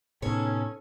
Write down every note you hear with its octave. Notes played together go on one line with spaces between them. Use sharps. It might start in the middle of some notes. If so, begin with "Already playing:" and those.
A2 C3 B3 C#4 D#4 G#4 A4 C#5